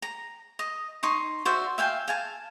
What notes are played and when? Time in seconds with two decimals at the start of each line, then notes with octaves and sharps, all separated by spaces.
0.02 A#5
0.59 D#5
1.03 D#4 C6 C#6
1.45 F#4 C5 D5 E5
1.78 E5 F5 G5 G#5
2.08 F5 G#5 A5